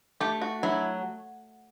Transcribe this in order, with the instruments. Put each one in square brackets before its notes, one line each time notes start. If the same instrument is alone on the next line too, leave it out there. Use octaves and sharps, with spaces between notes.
[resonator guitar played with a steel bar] A3 [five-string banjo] G4
[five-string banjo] F#4
[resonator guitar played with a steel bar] F#3 [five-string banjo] E4